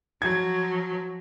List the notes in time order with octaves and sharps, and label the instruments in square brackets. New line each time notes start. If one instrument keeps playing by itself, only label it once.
[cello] F3 F#3 [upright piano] G#6